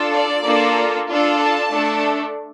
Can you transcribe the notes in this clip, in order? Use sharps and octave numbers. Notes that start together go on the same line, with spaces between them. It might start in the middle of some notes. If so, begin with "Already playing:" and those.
Already playing: D4 F4 A4
D5
A#3 D4 F4 A4
D4 F4 A4
A5
A3 D4 A4